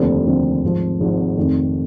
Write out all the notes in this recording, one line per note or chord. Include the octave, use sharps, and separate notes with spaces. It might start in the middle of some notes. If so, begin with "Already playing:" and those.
Already playing: F1 D#2 D3 F3 C4
F1 D#2 D3 F3 C4
G#1 G#2 F3
G#1 G#2 F3
F1 F2 D#3